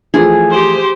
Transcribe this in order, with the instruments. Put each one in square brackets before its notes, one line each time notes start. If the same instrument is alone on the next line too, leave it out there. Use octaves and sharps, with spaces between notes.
[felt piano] E3 F3 A3 [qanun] G#4
[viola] G4 C5